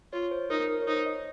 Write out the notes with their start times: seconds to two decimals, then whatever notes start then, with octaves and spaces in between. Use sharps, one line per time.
0.13 F4 C#5
0.31 C5
0.50 D#4 A#4
0.68 A#4
0.82 C#5
0.87 D#4 C5
1.06 D#5